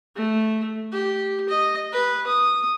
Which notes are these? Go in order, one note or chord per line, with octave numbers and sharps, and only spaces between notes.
A3
G4
D#5
B4
D#6